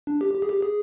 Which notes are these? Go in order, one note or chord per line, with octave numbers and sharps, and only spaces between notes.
D4
G4
G4
G#4
G4
G#4